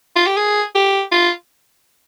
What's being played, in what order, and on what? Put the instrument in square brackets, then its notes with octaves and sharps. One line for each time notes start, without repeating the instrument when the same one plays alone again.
[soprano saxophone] F4
G4
G#4
G4
F4